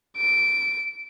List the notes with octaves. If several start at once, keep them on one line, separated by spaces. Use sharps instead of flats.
D7